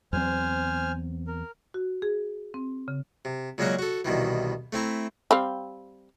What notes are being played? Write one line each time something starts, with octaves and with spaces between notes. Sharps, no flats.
E2 F#3 C4 C5 G#5 F6
A#4
F#4
G#4
C4
C#3
C3
A#2 C#3 F#3 G#3 C#4 F#4
F#4 A4
C2 B2 D#3 E3
A3 C4 E4 A#5
G3 C4 F5